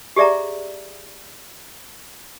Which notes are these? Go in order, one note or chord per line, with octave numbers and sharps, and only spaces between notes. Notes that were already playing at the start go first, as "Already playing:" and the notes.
G4 G#4 D5 E5 A#5